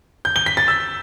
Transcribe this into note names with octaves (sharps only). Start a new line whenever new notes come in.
G6
G7
B6
A6
E6